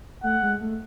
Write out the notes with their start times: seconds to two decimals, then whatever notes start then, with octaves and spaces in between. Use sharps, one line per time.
0.23 A3 F#5
0.42 G#3
0.61 A3